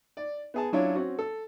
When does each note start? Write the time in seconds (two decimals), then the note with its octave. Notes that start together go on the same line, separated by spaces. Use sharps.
0.17 D5
0.54 B3 G#4 A5
0.73 F#3 C#4 D4 E4 F4 C#5
0.95 C4 C#4 F#4
1.19 A4